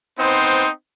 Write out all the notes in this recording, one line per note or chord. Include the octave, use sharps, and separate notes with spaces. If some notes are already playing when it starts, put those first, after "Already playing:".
B3 C4 D#4 C5